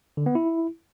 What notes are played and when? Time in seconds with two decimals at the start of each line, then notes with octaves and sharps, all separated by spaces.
0.17 D3
0.26 B3
0.35 E4